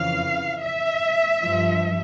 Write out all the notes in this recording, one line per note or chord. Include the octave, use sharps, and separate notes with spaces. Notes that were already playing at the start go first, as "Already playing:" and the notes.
Already playing: F2 C#3 E3 F5
E5
G2 F3